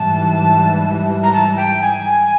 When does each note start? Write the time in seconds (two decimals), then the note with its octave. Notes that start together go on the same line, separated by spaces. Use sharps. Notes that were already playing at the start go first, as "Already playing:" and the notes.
Already playing: G#2 E3 G3 A5
1.23 A#5
1.33 A5
1.57 G5
1.82 G#5